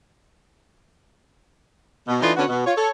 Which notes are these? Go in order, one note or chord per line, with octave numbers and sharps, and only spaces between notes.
B2
E3 A3 D4 D#4 F4
D3 B3 C#4 F#4
B2
F4 C#5
A4 C#5